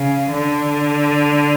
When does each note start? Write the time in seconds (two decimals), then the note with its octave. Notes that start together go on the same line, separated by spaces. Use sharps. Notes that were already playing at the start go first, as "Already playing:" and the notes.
Already playing: C#3
0.32 D3